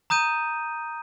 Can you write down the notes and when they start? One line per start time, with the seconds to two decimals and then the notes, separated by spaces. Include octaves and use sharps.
0.10 A#5 D#6 G6 D#7